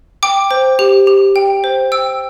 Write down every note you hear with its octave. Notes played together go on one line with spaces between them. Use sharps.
G5 D6
C5
G4
G4
G5
C5
G5 E6